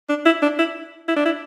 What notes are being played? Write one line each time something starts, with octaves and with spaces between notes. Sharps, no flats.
D4
E4
D4
E4
E4
D4
E4